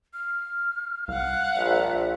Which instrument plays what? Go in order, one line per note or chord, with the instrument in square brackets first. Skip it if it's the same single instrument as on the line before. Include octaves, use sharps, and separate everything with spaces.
[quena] F6
[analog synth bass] C2 [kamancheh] F5 F#5
[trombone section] A#1 [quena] E5